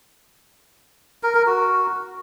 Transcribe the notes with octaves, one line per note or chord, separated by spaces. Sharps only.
A#4
A#4
F#4